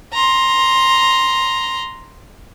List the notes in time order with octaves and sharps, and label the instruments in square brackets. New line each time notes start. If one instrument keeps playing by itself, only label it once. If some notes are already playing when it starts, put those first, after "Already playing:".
[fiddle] A#5 C6